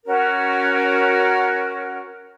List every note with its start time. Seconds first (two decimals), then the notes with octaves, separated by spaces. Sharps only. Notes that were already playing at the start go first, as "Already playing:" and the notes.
0.06 C#4 F#4 A#4